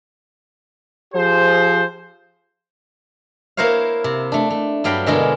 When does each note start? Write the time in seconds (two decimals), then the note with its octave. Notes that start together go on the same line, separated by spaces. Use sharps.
1.14 F3 G4 G#4 C5
3.57 A#3 E4 A#4 C5 C#5 F5
4.04 C3
4.32 A3 D4
4.50 A3
4.84 G2 F#3 D5 F5 G5 B5
5.06 B2 D3 G#3 E4 F4 A#4